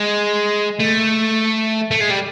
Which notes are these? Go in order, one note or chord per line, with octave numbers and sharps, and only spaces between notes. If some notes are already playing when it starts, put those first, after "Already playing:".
Already playing: G#3
A3
A3
G#3
G3